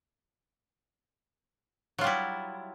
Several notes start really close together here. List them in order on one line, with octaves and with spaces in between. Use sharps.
F#3 F4 G3 E4